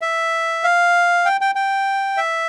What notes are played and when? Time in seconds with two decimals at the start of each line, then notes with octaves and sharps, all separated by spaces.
0.01 E5
0.64 F5
1.25 G5
1.41 G5
1.55 G5
2.17 E5